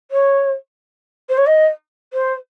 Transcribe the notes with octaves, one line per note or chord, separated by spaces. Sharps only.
C#5
C5
C#5
D#5
C5